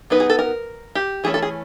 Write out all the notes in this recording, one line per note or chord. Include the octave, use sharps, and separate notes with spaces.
F#3 B3 D#4 B4
G#4
A4
A#4
G4
E3 A3 C#4 G#4
A4
G#4